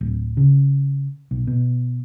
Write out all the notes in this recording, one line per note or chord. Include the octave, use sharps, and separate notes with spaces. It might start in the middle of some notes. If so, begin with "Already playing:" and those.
D1
C#3
B1
B2